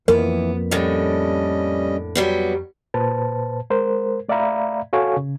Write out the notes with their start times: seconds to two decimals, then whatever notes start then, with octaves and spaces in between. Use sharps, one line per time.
0.08 F2 E3 F3 A#3 B3 A#4
0.71 A2 D3 G3 C#4 D#5
2.15 F#3 G3 B3
2.94 A#2 B4 C5 A5
3.70 G#3 A#4 C5
4.29 A3 D5 E5 F5 A#5 B5
4.93 F#4 A4 C#5 F5 G#5 C#6
5.17 C#3